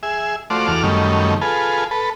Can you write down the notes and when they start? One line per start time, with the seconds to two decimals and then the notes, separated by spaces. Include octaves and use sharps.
0.03 G#4 E5
0.50 A3 F4 F#4 C5 D5
0.68 E2 F#4 A4 D6 F6
0.83 F#2 D#3 G3 A3 C#4
1.41 F4 G#4 A4 B4
1.91 A4 B4